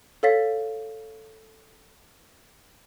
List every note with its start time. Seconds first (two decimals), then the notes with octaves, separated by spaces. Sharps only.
0.23 A4 C#5 F5 A6 B6